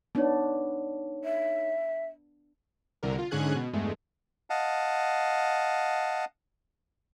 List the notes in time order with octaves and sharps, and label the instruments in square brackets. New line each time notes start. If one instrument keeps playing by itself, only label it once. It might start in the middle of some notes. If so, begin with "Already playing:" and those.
[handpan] B3 D4 [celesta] D#4 C#5
[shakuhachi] E5
[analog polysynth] C2 D3 A#4
F4
G#2 D3 C#4 G#4 F#6 G#6
B2
E2 G2 G#3 A3
[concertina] D#5 F5 F#5 A5